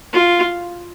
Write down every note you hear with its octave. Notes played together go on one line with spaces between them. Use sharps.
F4